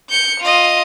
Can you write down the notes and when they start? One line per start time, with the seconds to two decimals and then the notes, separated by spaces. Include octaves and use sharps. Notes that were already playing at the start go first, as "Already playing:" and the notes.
0.10 G6 C#7
0.41 F4 D#5